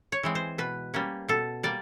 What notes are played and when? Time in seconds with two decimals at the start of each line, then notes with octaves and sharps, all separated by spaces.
0.12 C#5
0.23 E3 G#3 C4
0.35 C5
0.58 B2 B4
0.94 G3 A#3 C#4
1.28 B2 A4
1.63 G3 A#3 D5